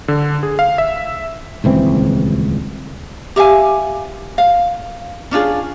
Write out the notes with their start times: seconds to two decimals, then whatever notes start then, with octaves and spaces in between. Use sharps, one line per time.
0.08 D3
0.43 G#4
0.59 F5
0.78 E5
1.64 D#1 C#2 E3 C4
3.36 G4 E5 F5 G#5
4.38 F5
5.31 C#4 D4 F4 G#4